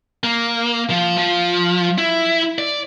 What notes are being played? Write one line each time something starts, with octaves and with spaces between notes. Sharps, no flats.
A#3
F3
F3
E4
D5